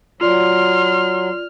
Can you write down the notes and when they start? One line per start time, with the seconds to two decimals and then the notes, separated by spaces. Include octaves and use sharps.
0.21 F#3 F4 D5 C6 F6